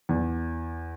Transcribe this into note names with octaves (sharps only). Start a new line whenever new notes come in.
E2